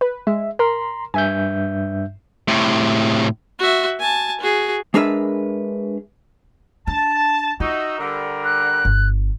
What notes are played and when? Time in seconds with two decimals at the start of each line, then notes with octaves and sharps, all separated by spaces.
0.01 B4
0.27 G#3 E5
0.59 A#4 A#5 C6
1.14 G2 E5 G#5 G6
2.48 A2 C3
3.59 F#4 E5
3.99 G#5 A5
4.41 F#4 G#4
4.94 G#3 D4 G#4 A#4 B4 E5
6.87 D4 A5
7.60 D#4 F4 F#4 E5
7.98 D3 G3 A#4
8.44 F#6
8.85 G1